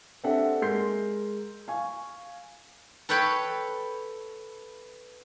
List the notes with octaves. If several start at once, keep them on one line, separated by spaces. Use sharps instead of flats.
C4 D4 G4 A4 E5 F#5
G#3 A#4 C6 G6 C7
F5 G#5 C#6
A4 B4 C#5 G5 B5